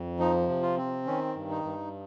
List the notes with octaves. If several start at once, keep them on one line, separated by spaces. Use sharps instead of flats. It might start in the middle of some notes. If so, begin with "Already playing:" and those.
Already playing: F2
F3 D#4
C3
F4
C4
D#3 C#4
G2
D#4
G2